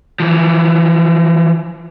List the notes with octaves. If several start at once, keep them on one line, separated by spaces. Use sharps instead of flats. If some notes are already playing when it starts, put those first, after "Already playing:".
E3 F3